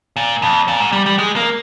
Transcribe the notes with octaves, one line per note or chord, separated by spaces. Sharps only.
A#2
F2
A#2
G#2
G3
G3
G#3
A#3